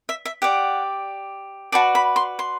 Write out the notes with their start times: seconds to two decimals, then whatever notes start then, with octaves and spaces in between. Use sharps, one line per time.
0.09 E5
0.25 E5
0.42 G4 D5 F#5
1.72 F#4 B4 D5 A5
1.95 B5
2.16 C6
2.39 C6